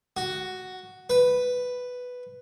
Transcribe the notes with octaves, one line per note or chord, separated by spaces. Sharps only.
F#4
B4